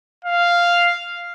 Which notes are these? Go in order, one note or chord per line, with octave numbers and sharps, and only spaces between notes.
F5